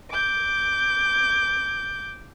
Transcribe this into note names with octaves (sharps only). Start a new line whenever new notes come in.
D6 G6